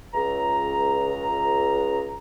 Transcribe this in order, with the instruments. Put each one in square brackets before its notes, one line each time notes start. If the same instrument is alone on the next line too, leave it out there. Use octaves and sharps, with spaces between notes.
[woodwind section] C#2 A#5